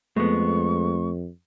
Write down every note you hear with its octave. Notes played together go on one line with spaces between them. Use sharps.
F2 G#3 A3 B3 C#6